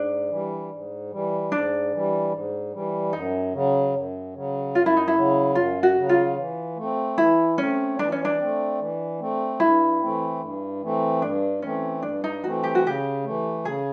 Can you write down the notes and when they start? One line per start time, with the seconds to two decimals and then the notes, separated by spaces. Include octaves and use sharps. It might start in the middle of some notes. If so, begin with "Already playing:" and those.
Already playing: G#2 D4
0.30 E3 G3
0.71 G#2
1.11 E3 G3
1.52 G#2 D4
1.92 E3 G3
2.32 G#2
2.73 E3 G3
3.13 F#2 D#4
3.54 C#3 F#3
3.94 F#2
4.34 C#3 F#3
4.75 F#2 F4
4.86 E4
4.97 D#4
5.08 E4
5.16 C#3 F#3
5.55 F#2 F4
5.83 F#4
5.97 C#3 F#3
6.09 F4
6.37 E3
6.77 A3
6.82 C4
7.18 E3 E4
7.58 A3 C4 C#4
7.98 E3 D4
8.12 C#4
8.25 D4
8.39 A3 C4
8.80 E3
9.20 A3 C4
9.60 G2 E4
10.01 E3 A3 C4
10.41 G2
10.82 E3 A3 C4
11.22 G2 D4
11.62 E3 A3 C4 C#4
12.03 G2 D4
12.24 D#4
12.44 E3 A3 C4 F#4
12.64 G4
12.75 F#4
12.84 C#3 G4
13.24 E3 A3
13.65 C#3 G#4